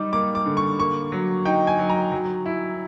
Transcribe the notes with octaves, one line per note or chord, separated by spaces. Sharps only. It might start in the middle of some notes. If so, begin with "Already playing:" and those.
Already playing: G3 D#4 D6
A#3 D6
D6
D3
C#6
A#3 C#6
F#3
D#4 G5
G#5
F#3
A#5
F#3
E4